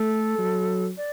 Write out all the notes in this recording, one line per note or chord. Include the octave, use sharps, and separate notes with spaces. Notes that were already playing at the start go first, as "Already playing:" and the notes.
Already playing: A3 A4
F#3
D5